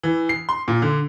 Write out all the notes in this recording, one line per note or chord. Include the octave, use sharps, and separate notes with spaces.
E3
C7
C6
A#2
D3